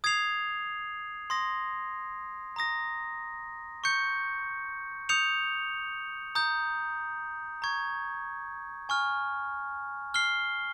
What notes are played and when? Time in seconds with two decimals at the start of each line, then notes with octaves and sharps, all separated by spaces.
0.04 D#6 G#6 C7 F7
1.30 C6 D#6 A#6
2.56 A#5 D#6 A#6
3.84 C#6 G6 C#7
5.09 D#6 G6 C#7 F7
6.35 A#5 D#6 G6
7.62 A#5 C#6 G#6
8.89 G#5 C#6 F6
10.14 F6 C7 G7